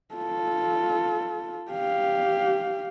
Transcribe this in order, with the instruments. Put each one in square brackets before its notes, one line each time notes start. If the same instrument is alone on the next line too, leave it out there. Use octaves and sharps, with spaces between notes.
[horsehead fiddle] F4 A4
G4 F5